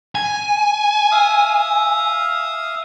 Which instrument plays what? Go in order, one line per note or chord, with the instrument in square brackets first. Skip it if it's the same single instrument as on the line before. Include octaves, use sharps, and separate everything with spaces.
[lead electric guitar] G#5
[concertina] E5 F5 D#6